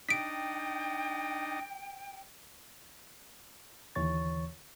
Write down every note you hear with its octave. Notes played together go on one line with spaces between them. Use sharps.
D4 D#4 D#5 G5 B6 D7
D#2 D3 E3 C#5 C#6 A6